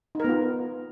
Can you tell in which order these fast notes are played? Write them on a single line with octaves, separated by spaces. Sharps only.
D#4 A#4 B3 F4